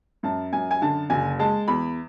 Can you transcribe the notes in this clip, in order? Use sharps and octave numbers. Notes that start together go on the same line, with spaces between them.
F#2 A5
F#2 G#5
G#5
D3 A5
F#1 G#5
G#3 A5
E2 B5